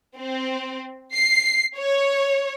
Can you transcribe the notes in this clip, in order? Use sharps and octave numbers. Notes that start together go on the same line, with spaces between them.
C4
C7
C#5